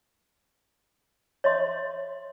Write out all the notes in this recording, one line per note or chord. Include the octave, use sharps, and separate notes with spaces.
C#5 D#5 E5 C6